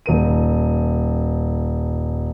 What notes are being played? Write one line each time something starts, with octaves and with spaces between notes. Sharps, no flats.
D#1 A#4 D#7